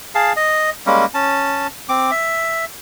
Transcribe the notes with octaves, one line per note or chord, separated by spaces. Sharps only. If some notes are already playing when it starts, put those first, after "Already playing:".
G#4 F5 A5
D#5
G3 G#3 A#3 C#4
C#4 A5
C4 D6
E5